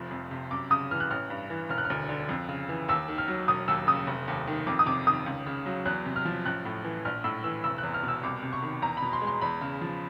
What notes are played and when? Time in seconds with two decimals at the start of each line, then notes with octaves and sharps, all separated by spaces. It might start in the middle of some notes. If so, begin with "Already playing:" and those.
Already playing: F1 F3
0.11 F2
0.31 C3
0.51 F#2 D6
0.70 C#3 D#6
0.91 E3 F6
1.00 F#6
1.10 A1 F6
1.30 G2
1.50 E3
1.69 E1 F6
1.78 F#6
1.85 F6
1.90 D2
2.09 D3
2.29 F2
2.49 C#3
2.69 E3
2.88 D#2 E6
3.08 D#3
3.18 F6
3.28 F#3
3.48 E1 D#6
3.68 D#2 E6
3.87 C#3 D#6
4.07 F1
4.28 D#2
4.48 D#3
4.67 F2 D6
4.79 D#6
4.86 C3 D6
5.07 D#3 D#6
5.26 C#2
5.46 C#3
5.66 F#3
5.85 E2 F#6
6.05 C3
6.16 F6
6.25 F3
6.46 A1 F#6
6.65 A2
6.84 E3
7.05 A#1 F6
7.24 A2 E6
7.44 E3 E6
7.64 F1 E6
7.78 F#6
7.83 E2
7.94 F6
8.03 B2
8.08 E6
8.23 C2 D6
8.43 C3
8.53 C#6
8.63 D#3
8.82 E2 A#5
8.97 B5
9.02 B2
9.13 C6
9.22 G#3
9.27 C6
9.41 E2 B5
9.61 C#3
9.81 F3